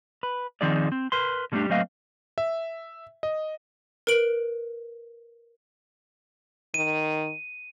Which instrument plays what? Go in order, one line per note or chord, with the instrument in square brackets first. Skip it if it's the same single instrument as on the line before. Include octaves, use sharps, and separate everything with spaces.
[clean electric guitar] B4
D#3 F3 C4 D#4 G#4 D5
C4
A#4 B4 C6
D3 G3 A3 C4 D4 G4
F#3 A3 A#3 C4 D#5 F5
[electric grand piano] E5
D#5
[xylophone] A#4 B4 D7 F#7
[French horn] D#3 [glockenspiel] D#7